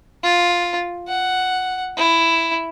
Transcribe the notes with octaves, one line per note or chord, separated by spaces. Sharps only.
F4
F#5
E4